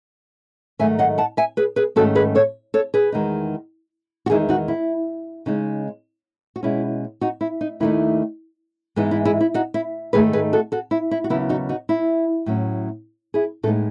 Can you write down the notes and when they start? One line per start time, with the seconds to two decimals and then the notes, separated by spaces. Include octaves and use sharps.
0.79 G#2 D#3 F#3 A3 D#4 E5 G#5
0.99 D#5 F#5
1.18 F#5 A5
1.37 E5 G#5
1.57 G#4 B4
1.76 G#4 B4
1.96 G#2 D#3 A3 C#4 F#4 A4
2.15 G#4 B4
2.35 A4 C#5
2.74 A4 C#5
2.94 G#4 B4
3.12 E2 D#3 G#3 D#4
4.26 F#4
4.30 E2 D#3 G#3 D#4 E4 G#4
4.49 D#4 F#4
4.68 E4
5.46 C#3 G#3 C#4 D#4
6.56 F#4
6.63 B2 G#3 C#4 E4
7.21 D#4 F#4
7.41 E4
7.61 D#4
7.80 D#2 D#3 A3 D#4 E4
8.96 G#2 E3 G#3 B3 D#4 E4
9.11 E4
9.25 E4 G#4
9.41 E4
9.54 D#4 F#4
9.74 E4
10.13 G#2 D#3 A3 D#4 G#4 B4
10.33 G#4 B4
10.53 F#4 A4
10.72 F#4 A4
10.91 E4
11.11 E4
11.24 F#4
11.30 D#2 C#3 F#3 B3 E4
11.49 D#4 F#4
11.69 D#4 F#4
11.89 E4
12.46 A2 F#3 C#4
13.34 E4 G#4
13.63 A2 G#3 B3 D#4 F#4 A4